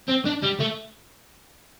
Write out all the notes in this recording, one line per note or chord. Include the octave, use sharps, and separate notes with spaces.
C4
D4
G3
A3